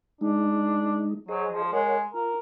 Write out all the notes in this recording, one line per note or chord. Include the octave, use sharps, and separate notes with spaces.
G#3 D4 D#4
F#3 G#4 C5 D#5
F3
G#3 A#4 C#5 F#5
F4 A#4